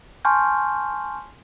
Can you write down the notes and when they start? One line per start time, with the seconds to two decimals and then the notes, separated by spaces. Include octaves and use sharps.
0.25 G#5 A5 C6 C#6 F6 G6